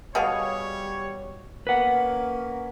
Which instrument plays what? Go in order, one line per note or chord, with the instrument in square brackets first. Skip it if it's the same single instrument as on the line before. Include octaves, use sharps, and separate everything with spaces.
[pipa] B2 G#4 F5 [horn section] G3 C#5
[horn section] A#3 C#4 [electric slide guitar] B4 F#5